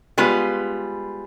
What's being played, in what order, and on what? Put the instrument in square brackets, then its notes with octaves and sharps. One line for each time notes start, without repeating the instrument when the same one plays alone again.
[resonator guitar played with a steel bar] G3 G#3 B3 F4 B4